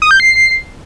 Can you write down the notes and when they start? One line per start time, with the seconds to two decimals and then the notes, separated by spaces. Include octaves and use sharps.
0.02 D#6
0.11 G6
0.20 C7